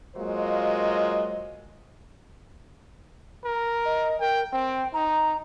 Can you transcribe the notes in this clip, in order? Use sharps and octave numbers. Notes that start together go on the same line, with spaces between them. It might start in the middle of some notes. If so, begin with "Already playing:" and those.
F#3 G#3 A#3 F4 C5 D#5
A#4
D#5
A#4 G5
C4 G5
D#4 A#5